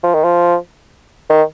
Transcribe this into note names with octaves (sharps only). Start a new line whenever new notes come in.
F3
D#3
F3
D#3